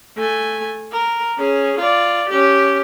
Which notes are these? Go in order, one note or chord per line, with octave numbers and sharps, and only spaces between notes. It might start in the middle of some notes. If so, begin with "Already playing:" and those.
A3 G#5
A#4
C#4 G#4
F4 D5
C#4 G4